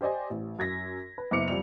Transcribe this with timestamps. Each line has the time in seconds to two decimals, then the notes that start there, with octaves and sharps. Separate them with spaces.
0.01 G4 C5 D5 D#5 G#5
0.30 A1
0.59 F#2 G#6 A#6 B6
1.18 B4
1.31 F#1 B3 E4 D6 C#7 F7
1.48 F2 G3 F7